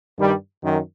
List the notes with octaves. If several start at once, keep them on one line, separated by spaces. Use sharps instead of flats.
G2 D#3 G3
F#2 D#3